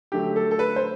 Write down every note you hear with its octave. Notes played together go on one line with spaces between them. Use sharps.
D3 F#3 A3 G4
A4
A4
B4
C5